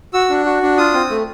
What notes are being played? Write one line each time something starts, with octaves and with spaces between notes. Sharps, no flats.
F#4 E6
D4
F#4
D4
F4 D#6
C4
A3